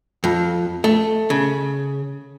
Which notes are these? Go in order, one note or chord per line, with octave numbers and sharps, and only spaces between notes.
F2
A3
C#3